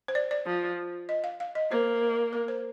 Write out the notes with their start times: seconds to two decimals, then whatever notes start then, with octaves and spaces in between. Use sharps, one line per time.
0.08 C5
0.15 D5
0.31 D5
0.46 F3
1.09 D#5
1.24 F5
1.40 F5
1.55 D#5
1.71 A#3 C5
2.33 A#4
2.48 C5